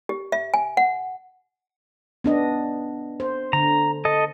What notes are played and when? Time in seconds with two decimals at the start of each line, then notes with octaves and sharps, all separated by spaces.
0.09 G4
0.32 E5
0.54 G#5
0.77 F#5
2.24 B3 D4 D#5
3.20 C5
3.53 D3 A#5
4.05 A4 D#5